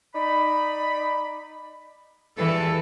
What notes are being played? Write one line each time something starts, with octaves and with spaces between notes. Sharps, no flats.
D#4 D5 B5
E2 G2 E3 A4